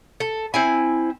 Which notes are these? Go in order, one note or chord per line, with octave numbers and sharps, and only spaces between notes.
A4
C4 E4 G#5